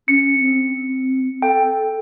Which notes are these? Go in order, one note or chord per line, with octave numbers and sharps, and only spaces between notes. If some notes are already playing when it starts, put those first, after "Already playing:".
C#4 C#7
C4
A4 G5